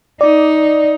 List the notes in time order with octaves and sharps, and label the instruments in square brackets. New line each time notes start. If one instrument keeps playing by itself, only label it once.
[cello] D#4 [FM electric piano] D5